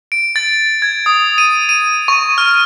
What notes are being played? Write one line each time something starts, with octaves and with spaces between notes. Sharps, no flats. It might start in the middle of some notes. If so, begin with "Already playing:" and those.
D7
A6
G#6
D#6
D#7
D#7
C#6
F6